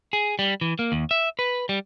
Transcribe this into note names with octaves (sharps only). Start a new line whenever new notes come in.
G#4
G3
E3
A#3
D#2
E5
B4
G3